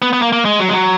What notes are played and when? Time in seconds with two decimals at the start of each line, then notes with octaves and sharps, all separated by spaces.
0.02 B3
0.13 B3
0.22 A#3
0.33 A#3
0.45 G#3
0.60 F#3
0.68 G#3
0.73 F#3